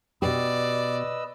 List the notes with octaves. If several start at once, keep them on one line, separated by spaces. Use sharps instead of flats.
B2 G4 B4 D5 D#5 E6